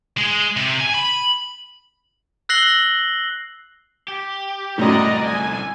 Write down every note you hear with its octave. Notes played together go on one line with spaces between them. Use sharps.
G#3
C3
G#5
B5
E6 F#6 A#6 C7 F#7 G7
G4
C2 F#2 A2 D3 D5 D#5 A#5
G#5